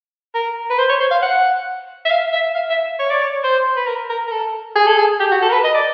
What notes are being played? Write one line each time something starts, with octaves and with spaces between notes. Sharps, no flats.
A#4
B4
C5
C#5
C5
F5
F#5
E5
F5
E5
F5
E5
C#5
D5
C#5
C5
B4
A#4
A#4
A#4
A4
G#4
A4
G#4
G4
F#4
A4
A#4
B4
D#5
D5